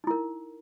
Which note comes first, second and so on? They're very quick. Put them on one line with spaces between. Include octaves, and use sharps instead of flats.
D#4 E4 A#4